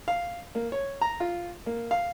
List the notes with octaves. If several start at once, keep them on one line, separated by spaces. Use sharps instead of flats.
F5
A#3
C#5
A#5
F4
A#3
F5